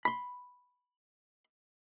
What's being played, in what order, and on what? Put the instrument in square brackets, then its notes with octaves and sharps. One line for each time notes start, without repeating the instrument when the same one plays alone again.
[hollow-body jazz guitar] B5 C6